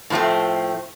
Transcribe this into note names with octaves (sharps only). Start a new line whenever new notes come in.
A2 F3 A3 C4